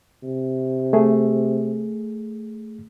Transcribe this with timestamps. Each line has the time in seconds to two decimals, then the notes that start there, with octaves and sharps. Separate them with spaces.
0.23 C3
0.93 A3 G#4